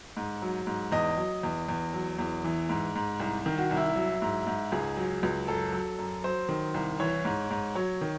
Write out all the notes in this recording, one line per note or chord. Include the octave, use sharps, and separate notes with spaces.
G#2
F#3
G#2
E2 D#5
F#3
E2
E2
F#3
E2
E3
G#2
G#2
C2
D#3
F#4
C2
E4
F#3
G#2
G#2
C#2 G#4
F#3
C#2
F#2 A4
F#3
F#2
F#3 C5
D#3
C2
E3 C#5
G#2
G#2
F#3 C#5
D#3